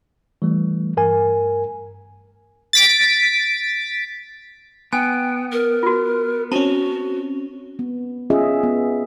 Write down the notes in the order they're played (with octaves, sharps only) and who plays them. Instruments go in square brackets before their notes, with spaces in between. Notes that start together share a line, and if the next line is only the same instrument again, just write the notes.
[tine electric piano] E3 G3 A3
G2 A#4 G#5
[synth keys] A6 B6 D7
[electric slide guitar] B3 [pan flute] G5 [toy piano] G#5
[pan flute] A#4
[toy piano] F4 F#4
[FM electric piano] C4 C#4 [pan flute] F#4 [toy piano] A5
[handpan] B3
C#4 F4 G#4 D#5 E5
B3